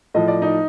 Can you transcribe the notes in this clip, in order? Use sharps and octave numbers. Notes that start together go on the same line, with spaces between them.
A2 F3 D#5
D5
D#4 D#5